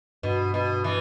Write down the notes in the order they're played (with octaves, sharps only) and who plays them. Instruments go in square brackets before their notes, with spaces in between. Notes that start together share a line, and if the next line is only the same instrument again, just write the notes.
[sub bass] G2 [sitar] B2
[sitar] B2
E3